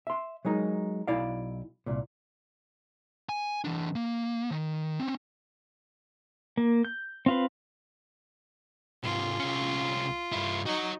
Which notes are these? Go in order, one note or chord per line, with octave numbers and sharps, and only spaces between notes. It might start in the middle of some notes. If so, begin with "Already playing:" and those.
E5 C6
F#3 G#3 D#4 A#4
B1 E4 D5 F5
C2 A#2
G#5
E3 D4
A#3
D#3
C4 C#4
A#3
G6
C4 F4 B4
G#2 C3 F4
C2 C#4
G2 E4
D#4 F#4 C#5